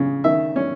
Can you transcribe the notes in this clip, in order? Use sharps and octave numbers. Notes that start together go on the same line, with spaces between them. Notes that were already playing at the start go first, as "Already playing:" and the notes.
Already playing: C#3
D#3 E5
C#4